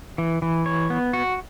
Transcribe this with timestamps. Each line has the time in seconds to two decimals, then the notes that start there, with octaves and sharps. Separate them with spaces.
0.18 E3
0.42 E3
0.66 C#5
0.90 B3
1.13 F#4